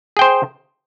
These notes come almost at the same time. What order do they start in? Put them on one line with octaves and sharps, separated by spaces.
G#4 G5 C5